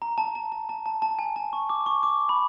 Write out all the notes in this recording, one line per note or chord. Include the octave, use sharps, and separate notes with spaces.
A#5
A5
A5
A5
A5
A5
A5
G#5
A5
C#6
D6
C#6
D6
B5